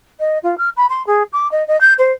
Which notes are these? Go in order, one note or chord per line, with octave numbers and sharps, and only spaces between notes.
D#5
F4
F6
B5
C6
G#4
D6
D#5
D#5
G6
C5